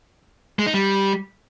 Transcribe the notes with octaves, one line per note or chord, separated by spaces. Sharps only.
G#3
D#4
G3